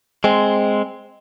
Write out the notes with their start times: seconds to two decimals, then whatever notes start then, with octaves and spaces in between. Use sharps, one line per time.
0.24 G#3 C4